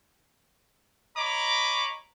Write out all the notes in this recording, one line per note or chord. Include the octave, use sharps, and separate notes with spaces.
C#5 D#5 A#5 B5 D6